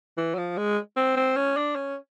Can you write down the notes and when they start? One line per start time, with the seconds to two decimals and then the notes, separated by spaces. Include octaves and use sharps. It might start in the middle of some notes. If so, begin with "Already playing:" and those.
0.18 E3
0.34 F#3
0.38 F3
0.57 G#3
0.97 C4
1.16 C4
1.36 C#4
1.57 D4
1.76 C#4